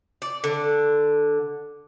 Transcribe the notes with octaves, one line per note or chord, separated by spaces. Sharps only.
D5
D3